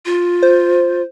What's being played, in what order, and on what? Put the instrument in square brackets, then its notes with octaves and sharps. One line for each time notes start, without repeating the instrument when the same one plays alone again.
[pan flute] F4
[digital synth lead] C5